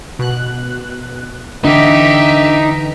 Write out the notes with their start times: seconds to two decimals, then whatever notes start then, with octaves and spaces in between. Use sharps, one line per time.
0.19 B2 F#6
1.65 D3 E3 D4 D#4 G4 E5